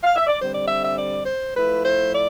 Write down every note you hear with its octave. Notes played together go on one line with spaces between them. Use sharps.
F5
E5
D5
D3 G3 C4 C5
D5
E5
E5
D5
C5
F3 A3 E4 B4
C5
D5